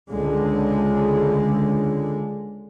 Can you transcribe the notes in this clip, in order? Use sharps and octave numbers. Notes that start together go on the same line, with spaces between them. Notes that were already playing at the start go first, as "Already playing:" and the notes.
C#2 D3 G#3